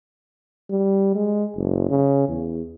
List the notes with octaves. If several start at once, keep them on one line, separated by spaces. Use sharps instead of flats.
G3
G#3
F#1
C#3
E2